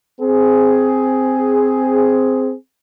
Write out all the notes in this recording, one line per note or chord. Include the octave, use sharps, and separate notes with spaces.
C4 G#4